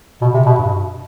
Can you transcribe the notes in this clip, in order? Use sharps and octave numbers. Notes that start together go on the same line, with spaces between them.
B2
C3
B2
G2